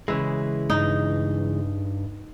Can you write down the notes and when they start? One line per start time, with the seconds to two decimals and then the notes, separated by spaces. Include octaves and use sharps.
0.08 C#3 E3 G#3 E4
0.70 G2 D#4